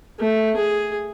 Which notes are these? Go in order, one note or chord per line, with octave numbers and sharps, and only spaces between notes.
A3
G#4